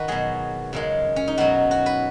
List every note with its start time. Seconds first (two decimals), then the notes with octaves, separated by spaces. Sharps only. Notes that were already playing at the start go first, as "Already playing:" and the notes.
Already playing: D#3 D#4 F#4 B4
0.08 B2 F#3 G#4
0.73 F#2 C#3 G#3
1.16 C#4
1.28 D#4
1.38 B2 F#3 F#4
1.71 F#4
1.86 B4